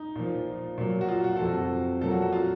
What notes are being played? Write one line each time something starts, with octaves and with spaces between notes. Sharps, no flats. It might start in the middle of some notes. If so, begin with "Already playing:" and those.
Already playing: D#4
A#2 F3
A#2 F#3
F#4
F4
F#4
F2 C3 F3 A4
F#4
A#2 F#3 A4
F#4
F#4
F4